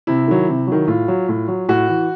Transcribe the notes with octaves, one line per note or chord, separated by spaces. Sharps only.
C3 E4
D#3 F#3
C3
D#3 F#3
A2 F4
F#3
A2
F#3
A2 F#4
E3